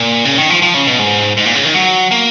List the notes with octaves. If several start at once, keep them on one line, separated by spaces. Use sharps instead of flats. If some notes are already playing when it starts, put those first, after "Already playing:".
Already playing: A#2
C#3
D#3
F3
F3
C#3
B2
G#2
G#2
A#2
C#3
D#3
F#3
A#3